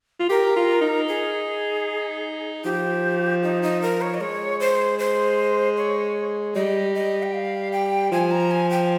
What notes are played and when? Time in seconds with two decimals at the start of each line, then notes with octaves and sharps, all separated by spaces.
0.20 F4
0.29 G4 A#4
0.56 F4
0.81 D#4
1.08 G#4
2.65 F3 G4
3.43 D#4
3.63 D#4
3.82 A#4
4.02 C#5
4.14 D#5
4.21 G#3 C#5
4.60 C5
4.99 C5
5.77 C#5
6.55 G3 D#5
6.95 D#5
7.23 G5
7.34 F5
7.73 G5
8.12 F3 G#5
8.31 A#5
8.51 G#5
8.70 G5